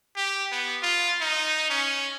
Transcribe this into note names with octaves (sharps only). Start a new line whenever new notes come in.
G4
B3
F4
D#4
C#4